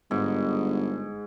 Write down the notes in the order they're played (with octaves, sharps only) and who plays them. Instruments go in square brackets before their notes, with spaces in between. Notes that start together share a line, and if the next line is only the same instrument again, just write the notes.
[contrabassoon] G1 [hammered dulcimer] G#2